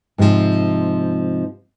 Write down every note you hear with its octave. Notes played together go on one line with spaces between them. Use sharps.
G#2 C3 D#3 F3